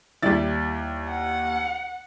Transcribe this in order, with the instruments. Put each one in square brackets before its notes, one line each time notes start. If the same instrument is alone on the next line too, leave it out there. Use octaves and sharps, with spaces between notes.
[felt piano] D#2 A6 [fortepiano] G3 E4
[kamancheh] F#5